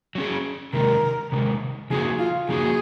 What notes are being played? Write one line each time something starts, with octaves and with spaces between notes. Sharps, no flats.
F#3 C#4 G#4
C3 D#3 G#3 A#4
C3 D#3 G#3
C#3 F3 A#3 D#4 F#4 G#4
F4
C#3 F3 A#3 D#4 F#4 G#4